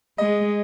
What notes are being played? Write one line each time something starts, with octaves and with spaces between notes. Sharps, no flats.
G#3 D#5